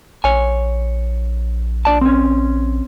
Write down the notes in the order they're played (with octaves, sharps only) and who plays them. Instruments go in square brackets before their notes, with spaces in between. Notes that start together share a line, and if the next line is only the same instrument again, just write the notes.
[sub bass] A#1 [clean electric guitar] C#5 G#5
[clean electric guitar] D4 D5 A5
C4 C#4